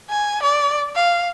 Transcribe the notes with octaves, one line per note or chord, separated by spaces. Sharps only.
G#5
D5
F5